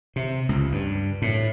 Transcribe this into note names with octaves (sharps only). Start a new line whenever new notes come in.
C3
C#2
G2
A2